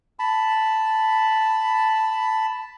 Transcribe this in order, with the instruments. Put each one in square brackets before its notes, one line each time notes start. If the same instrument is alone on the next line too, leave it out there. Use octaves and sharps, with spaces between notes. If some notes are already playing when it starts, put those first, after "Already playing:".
[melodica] A5 B5